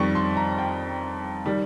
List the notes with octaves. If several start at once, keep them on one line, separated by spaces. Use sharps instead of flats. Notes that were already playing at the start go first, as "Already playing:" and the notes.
Already playing: F2 D#3 G3 C#6
C6
A#5
G5
D#3 G3